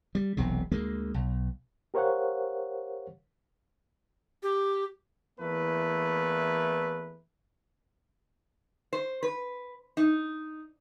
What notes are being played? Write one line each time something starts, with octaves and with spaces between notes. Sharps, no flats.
G3
E1 B1 C3
D2 G#3 A#3
B1
G4 A#4 C5 C#5 F5 F#5
G4
E2 E3 A3 A#3 B4
C5
B4
D#4